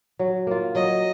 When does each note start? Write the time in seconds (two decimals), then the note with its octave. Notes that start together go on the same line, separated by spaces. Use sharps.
0.19 F#3
0.47 A#3 F4
0.75 F#3 D#5